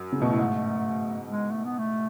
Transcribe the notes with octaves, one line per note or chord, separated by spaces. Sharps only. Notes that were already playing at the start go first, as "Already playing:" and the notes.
Already playing: F#2
C#3 A3
B2
A2
G#2
G#3
A3
B3
A3